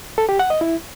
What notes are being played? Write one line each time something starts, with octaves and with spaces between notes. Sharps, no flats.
A4
G4
F#5
D#5
E4